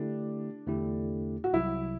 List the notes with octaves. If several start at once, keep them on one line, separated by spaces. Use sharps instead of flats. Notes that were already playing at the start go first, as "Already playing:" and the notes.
Already playing: D3 A3 D4 E4 G4
E2 D3 A3 E4 G4
F#4
C2 C3 F#3 E4